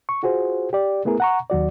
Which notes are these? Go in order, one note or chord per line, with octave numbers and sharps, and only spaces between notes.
C#6
F4 F#4 G#4 C5
G4 D5
A3 B3 E4 G#4 A#4
F#5 A#5 C#6
D#2 F#3 F#4 D5